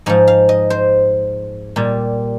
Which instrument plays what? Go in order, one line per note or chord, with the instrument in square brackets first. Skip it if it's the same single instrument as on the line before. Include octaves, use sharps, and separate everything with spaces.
[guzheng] G#2 F3 D#5
F5
D#5
C5
A#2 G3